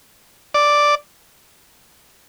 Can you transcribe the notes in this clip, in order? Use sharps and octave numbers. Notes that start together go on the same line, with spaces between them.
D5